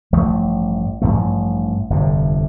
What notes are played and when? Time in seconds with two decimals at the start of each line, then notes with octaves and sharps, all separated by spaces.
0.13 A1 G2 F3 A3
1.02 A1 G2 F3 A3
1.90 G1 F2 C3